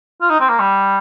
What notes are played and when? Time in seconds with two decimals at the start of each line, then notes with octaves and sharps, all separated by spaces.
0.21 F4
0.30 D#4
0.40 C4
0.49 A#3
0.59 G3